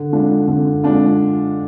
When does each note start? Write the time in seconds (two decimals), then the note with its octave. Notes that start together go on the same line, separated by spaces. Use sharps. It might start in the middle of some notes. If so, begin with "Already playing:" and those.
Already playing: D3
0.13 G#3 D4 F4
0.47 D3
0.84 G#3 D4 F4